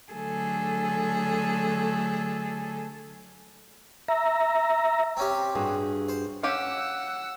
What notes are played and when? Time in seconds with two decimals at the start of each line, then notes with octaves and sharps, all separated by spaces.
0.11 D3 F#3 A3 G#4 A4
4.08 E5 A#5
5.17 C4 C#4 G4
5.55 G2 F#4 G#4
6.09 C5
6.43 C#4 G4 F5 F#5 E6